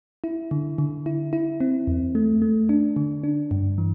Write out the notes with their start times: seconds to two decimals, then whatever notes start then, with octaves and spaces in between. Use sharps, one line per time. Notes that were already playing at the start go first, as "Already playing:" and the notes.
0.24 E4
0.51 D3
0.78 D3
1.06 E4
1.33 E4
1.60 C4
1.87 E2
2.15 A3
2.42 A3
2.69 D4
2.96 D3
3.24 D4
3.51 G2
3.78 E3